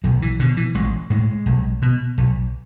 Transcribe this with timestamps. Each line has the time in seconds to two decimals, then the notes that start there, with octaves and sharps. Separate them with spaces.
0.04 B1 F#3
0.22 E3
0.39 B2 D3
0.57 E3
0.75 A1 G#3
1.10 A2 G#3
1.46 B1
1.82 B2
2.18 B1